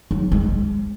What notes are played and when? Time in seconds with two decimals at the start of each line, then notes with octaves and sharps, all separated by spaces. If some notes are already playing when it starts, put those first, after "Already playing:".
0.11 F#3
0.32 G#3